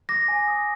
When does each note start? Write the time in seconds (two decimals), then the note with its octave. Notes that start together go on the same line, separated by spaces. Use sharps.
0.09 D6 A#6
0.28 G#5
0.48 D#6